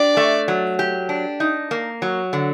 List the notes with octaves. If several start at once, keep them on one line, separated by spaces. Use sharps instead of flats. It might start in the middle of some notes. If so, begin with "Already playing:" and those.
Already playing: D4 G4 D5
A3
F#3
G4
D4
D#4
A#3
F#3
D3